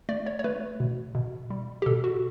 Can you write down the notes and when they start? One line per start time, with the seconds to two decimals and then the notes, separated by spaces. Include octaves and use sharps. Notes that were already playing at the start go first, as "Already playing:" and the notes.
0.09 A3 D5
0.26 C#5
0.39 C#5
0.44 A3 B4
0.80 B2
1.15 B2
1.50 G3
1.82 G4
1.86 B2 A4
2.04 F#4